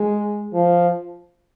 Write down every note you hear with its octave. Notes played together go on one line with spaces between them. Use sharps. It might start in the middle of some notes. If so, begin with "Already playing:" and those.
Already playing: G#3
F3